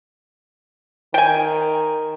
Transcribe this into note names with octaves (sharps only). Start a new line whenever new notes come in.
D#3 G5 G#5